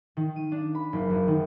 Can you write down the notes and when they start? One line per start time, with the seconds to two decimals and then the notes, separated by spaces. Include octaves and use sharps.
0.17 D#3
0.36 D#7
0.52 D4
0.75 B5
0.93 F#1
1.10 F#2
1.28 D#3